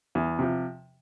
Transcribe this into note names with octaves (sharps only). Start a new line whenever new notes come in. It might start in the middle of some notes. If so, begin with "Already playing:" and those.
E2
C3 F3